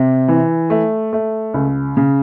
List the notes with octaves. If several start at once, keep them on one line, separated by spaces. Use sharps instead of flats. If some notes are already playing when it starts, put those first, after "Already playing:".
Already playing: C3
E3
A3
A3
C#2
C#3